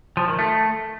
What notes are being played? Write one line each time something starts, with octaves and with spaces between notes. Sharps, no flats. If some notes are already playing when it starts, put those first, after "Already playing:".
F3
D#3
A3